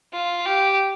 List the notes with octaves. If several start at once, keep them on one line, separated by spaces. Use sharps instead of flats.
F4
G4